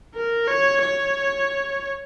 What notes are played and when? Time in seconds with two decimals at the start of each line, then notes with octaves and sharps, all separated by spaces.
0.15 A#4
0.48 C#5
0.82 C#5